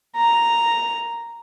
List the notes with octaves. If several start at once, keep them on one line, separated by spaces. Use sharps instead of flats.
A#5